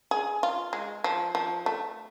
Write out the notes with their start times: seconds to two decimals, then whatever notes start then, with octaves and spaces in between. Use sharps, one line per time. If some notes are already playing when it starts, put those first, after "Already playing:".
0.11 G#4
0.43 F4
0.73 G#3
1.04 F3
1.35 F3
1.66 A3